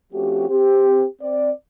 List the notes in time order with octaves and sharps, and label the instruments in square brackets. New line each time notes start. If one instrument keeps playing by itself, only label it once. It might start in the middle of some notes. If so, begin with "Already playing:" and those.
[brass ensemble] F3 A3 C4 C#4 F#4 G4
C4 G4
C4 D5